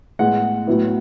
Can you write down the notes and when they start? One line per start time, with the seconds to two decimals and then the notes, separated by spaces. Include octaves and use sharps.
0.19 A2 G#3 B3 F#5
0.67 A2 F#3 B3 E4